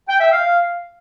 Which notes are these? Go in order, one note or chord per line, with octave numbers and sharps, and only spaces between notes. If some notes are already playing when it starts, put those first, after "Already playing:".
G5
E5
F5